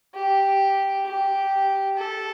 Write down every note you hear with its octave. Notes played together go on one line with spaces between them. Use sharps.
G4
G4
A4